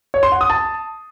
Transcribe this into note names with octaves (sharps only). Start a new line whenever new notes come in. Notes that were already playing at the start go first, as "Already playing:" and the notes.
C#5
C6
F#5
D#6
A5